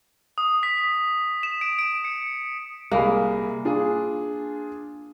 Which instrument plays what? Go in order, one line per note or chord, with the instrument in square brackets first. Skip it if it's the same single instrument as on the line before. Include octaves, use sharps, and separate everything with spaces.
[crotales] D#6
B6
E7
D7
D7
C#7
[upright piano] C2 G#4 B5 [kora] A#3
[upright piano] D4 F4 G#4